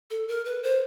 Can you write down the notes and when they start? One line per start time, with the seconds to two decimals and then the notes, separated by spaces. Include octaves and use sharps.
0.10 A4
0.28 A#4
0.45 B4
0.63 C5